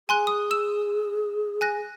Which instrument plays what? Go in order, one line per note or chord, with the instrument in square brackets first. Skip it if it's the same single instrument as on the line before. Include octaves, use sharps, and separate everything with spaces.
[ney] G#4 [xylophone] G#5 C6 F#6
[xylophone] D#6
E6 E7
G#5 F#6 A#6